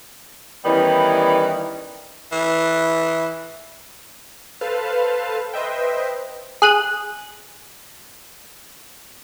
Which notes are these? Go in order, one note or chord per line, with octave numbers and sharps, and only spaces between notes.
D#3 E3 G3 B3 C#4 D#4
E3
A4 B4 C5 F5 A5
B4 C5 D#5 E5 G5
G#4 F#6 D#7